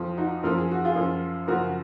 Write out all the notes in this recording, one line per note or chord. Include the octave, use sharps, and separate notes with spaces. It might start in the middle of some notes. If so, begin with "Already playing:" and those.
Already playing: F2 F3
D#4 F#4
F#2 F3 A#4
G#4
F#4
F4 G#4
F#2 F3
F#2 C#3 F3 F#4 A#4